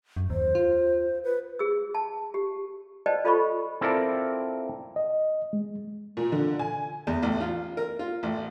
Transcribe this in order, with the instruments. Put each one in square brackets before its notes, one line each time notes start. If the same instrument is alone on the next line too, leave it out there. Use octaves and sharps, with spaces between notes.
[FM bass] F#2
[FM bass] D#2 [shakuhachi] C5
[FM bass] F4
[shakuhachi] B4
[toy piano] G#4 E6
A5
G4
B4 C5 D5 D#5 G5 A5
F4 A4 C5 D#5 B5 C#6
[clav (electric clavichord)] C4 E4 F4 A4 A#4 D5
[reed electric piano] D#5
G#3
[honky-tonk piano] A#2
D3
G#5
[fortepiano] E2
A1
F4
A#4
F4
A1